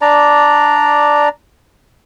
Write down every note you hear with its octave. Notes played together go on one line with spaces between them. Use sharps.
D4 D5 A#5